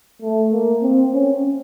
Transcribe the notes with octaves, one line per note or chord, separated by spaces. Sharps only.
A3
A#3
C4
C#4